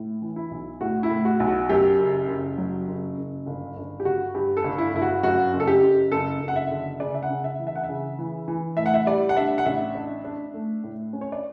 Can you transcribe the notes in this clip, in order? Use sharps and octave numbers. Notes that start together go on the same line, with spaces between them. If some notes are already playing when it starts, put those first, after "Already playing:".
Already playing: A2
E3
E4
B1
A2 F#4
E4
A2
F#4
B1
F#4
F#2 G4
F#1
F#1
F#3
F#1
F#1
G1
G1
G4
G1 F#4
G2 G4
A4
G1
E4
G1 E4
F#4
F#2 F#4
F#1
A4
G4
F#1
F#1 A4
F#1
F#5
E5
D3
C#3 D5
E5
F#5
C#3
E5
E3
E5
F#5
E5
C#3
E3
E3
A2 E5
F#5
E5
G3 D5
F#5
D4 E5
F#5
A1 E5
D4
D4
A3
A2
C#4
C#5
D5